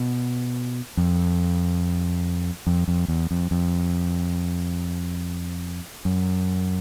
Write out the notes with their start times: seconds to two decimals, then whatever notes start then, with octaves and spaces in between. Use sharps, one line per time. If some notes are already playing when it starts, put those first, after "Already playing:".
Already playing: B2
0.97 F2
2.67 F2
2.88 F2
3.08 E2
3.31 F2
3.51 F2
6.05 F#2